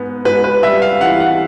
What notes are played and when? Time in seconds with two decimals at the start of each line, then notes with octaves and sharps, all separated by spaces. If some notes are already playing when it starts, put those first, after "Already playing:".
Already playing: G#2 B3
0.25 G#2 B4
0.44 B4
0.62 G3 E5
0.82 F5
1.01 E3 F#5
1.20 F#5